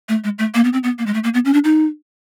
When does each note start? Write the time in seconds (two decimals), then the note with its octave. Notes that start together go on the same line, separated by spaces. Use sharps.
0.09 A3
0.24 G#3
0.39 A3
0.54 A#3
0.64 B3
0.73 C4
0.84 B3
0.99 A#3
1.06 G#3
1.14 A3
1.24 A#3
1.34 B3
1.45 C#4
1.53 D4
1.64 D#4